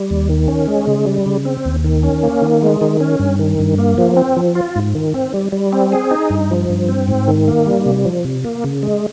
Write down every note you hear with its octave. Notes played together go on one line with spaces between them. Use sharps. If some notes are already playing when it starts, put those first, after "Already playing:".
Already playing: G3
D#2
D#3
C#4
G#3
C#3
G3
C#3
C4
D#2
D#3
C#4
A#3
D#3
G#3
D#3
C#4
G2
D#3
G2
A#3
F3
C4
F3
F4
G#2
D#3
C4
G3
G3
C4
G#4
D#4
G2
F3
G2
C4
G#2
D#3
A#3
G3
C3
F3
C3
A#3
C#3
G#3